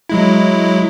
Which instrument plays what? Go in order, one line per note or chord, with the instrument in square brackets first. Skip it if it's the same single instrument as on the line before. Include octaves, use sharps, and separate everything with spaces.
[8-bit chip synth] F#3 G#3 E4